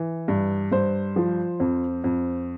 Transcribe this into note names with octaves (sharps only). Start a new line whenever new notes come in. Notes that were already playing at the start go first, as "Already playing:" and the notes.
Already playing: E3
G2
G2 C5
F3
F2
F2